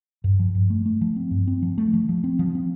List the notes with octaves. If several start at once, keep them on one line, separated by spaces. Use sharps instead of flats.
G2
F3
G2
A3
A3
F3
C4
G2
C4
F3
A3
F3
F3
C4
F3
C4